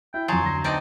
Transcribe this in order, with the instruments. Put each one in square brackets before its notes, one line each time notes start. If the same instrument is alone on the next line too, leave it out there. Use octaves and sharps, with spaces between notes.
[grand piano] E4 [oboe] G5
[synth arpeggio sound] F2 D#6 [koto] F#3 [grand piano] G#5 A6 [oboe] C6
[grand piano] D2 A#6
[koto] C4 D#4 D5 [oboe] A5